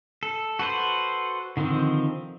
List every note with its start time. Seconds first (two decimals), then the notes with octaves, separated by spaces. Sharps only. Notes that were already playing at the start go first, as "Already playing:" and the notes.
0.23 A4
0.59 F#4 A4 B4 C5
1.57 D3 D#3 F3 C4